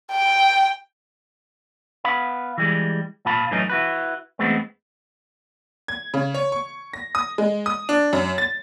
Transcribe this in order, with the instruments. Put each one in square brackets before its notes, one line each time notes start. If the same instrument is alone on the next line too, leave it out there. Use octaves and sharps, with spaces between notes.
[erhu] G5
[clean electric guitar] B3 F5 B5
E3 G3 G#3
A#2 F4 F5 A5 B5
F#2 A2 E3 F#3 C#4 D#4
E4 F#4 B4
E2 G#3 A3 B3 C4
[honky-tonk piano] G#6
C#3
C#5
C#6
A#6
D#6
G#3
D#6
D4
F#2
A6